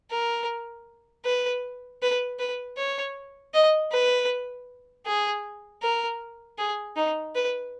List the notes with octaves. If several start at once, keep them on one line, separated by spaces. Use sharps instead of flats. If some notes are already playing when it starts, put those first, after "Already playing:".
A#4
B4
B4
B4
C#5
D#5
B4
G#4
A#4
G#4
D#4
B4